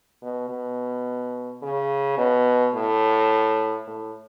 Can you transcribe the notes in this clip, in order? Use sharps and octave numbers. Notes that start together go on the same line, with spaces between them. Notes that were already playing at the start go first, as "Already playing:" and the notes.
B2
B2
C#3
B2
A2
A2